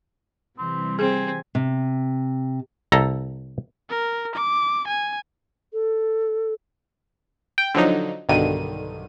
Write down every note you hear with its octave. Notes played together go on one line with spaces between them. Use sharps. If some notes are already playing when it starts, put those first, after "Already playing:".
C3 E3 G3 C4
C4 G#4 G#5
C3
C2 A4 A#5
A#4
D6
G#5
A4
G5
D3 F3 F#3 D#4
B1 G2 D3 D#3 D#7